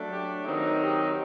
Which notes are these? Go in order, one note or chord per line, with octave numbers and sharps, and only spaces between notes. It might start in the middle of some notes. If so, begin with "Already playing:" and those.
Already playing: F#3 A3 D4
G4
D#3 F#3 C4 D#4
G4